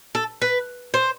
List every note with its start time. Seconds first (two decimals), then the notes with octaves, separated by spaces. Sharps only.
0.15 A4
0.42 B4
0.94 C5